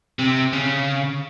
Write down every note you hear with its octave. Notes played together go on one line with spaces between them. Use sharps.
C3
C#3